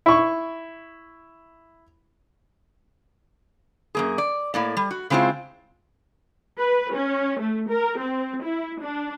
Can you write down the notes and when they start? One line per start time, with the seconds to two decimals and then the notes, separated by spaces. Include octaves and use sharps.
0.06 E4 C#6
3.95 F#2 A#3 G#4
4.18 D5
4.54 A2 A#3 D5
4.77 G3
4.91 F#4
5.10 C#3 G#3 C4 E4 F4
6.59 B4
6.93 C#4
7.40 A3
7.70 A#4
7.99 C4
8.44 E4
8.81 D4